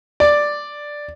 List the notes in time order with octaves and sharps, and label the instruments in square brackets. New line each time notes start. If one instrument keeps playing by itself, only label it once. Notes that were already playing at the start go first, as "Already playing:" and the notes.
[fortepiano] D5